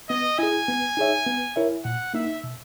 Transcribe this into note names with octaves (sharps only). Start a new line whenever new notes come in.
B3 D#5
E4 G#4 G#5
B3
D#4 G#4 C#5 E5
B3
E4 A#4 C#5 E5
A#2 F#5
A#3 D#4 E5
B2